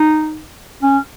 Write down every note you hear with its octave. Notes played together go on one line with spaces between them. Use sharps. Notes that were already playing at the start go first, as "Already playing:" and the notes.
Already playing: D#4
C#4